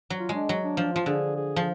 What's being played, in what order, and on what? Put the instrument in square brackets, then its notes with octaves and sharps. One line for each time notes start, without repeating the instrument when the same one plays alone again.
[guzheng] F#3
[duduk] F4
[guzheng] G#3 [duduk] D4
[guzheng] F#3
[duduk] D4
[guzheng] F3 [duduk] D4
[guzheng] F3 [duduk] F4
[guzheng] D3 [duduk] G#4
[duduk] G#4
[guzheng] F3